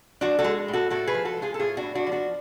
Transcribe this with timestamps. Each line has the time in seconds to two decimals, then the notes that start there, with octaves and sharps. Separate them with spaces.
0.21 F3 D4 F#4
0.39 F#4 A4
0.44 G#3
0.68 A2
0.73 F#4 A4
0.90 A2 F#4 A4
1.07 G#4 B4
1.14 F3
1.25 F#4 A4
1.37 G#3
1.42 F4 G#4
1.54 A4
1.60 A2 F4 G#4
1.77 D4 F#4
1.83 A2
1.95 D4 F#4
2.07 F3
2.12 D4 F#4